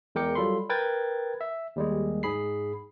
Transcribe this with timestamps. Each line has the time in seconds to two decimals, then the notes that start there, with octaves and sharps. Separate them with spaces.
0.15 E2 G#3 A#4 G5 D6 C#7
0.35 F#3 G3 F4 A4 B5 C6
0.69 A#4 B4 G5 G#6 A6
1.41 E5
1.76 D#2 G3 G#3
2.23 G#2 G#4 B5 C7